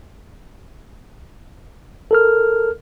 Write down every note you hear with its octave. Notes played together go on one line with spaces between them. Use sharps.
A4 A#4 F6